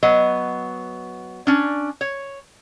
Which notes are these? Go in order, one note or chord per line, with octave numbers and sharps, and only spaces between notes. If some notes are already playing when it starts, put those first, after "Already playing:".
F#3 B3 D#5
C#4 D4
C#5